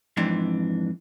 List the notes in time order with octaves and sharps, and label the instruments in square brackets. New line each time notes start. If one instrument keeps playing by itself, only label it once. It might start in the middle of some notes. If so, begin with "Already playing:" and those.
[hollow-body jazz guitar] F2 G#2 E3 C4 D4